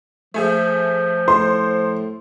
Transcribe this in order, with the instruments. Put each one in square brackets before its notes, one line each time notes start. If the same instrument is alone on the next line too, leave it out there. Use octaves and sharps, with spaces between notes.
[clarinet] F3 [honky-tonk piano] A3 G#4 E5
[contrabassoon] A2 [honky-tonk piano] C5 [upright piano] C6